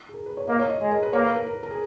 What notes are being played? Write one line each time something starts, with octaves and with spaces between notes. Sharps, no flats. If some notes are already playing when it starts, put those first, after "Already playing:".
G#4
A#4
B4
C#5
A#3 D#5
C#5
D#5
G#3 G#4
A#4
B4
A#3 C#5
B4
A#4
A#4
A#4
G#4